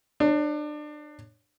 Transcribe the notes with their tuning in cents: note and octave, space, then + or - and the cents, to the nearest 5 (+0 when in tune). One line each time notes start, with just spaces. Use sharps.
D4 +30 C#5 +0